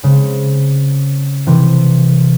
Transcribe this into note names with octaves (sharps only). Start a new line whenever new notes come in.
C#3 G#3 C4
C3 E3 C4